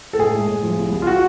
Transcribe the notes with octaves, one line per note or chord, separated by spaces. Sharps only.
A4
A2 G#4
G#3
A2
F3
C2
C2
F4
F#4